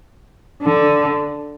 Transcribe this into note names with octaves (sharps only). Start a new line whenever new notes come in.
D3